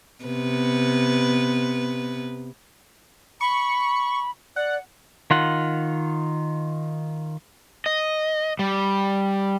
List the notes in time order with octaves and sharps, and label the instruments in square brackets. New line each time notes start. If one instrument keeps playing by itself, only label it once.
[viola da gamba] C3 B3 B4
[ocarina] B5 [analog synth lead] C#6
[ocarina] D5 [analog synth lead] F#5
[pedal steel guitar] D#3 F4 F#5
[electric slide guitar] D#5
G3